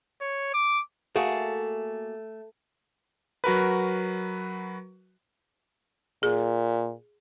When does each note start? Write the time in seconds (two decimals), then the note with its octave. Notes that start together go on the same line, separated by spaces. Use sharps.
0.21 C#5
0.54 D6
1.16 A3 A#3 F#4 G#4
3.44 F#3 F#4 A#4 B4
6.23 A#2 G#4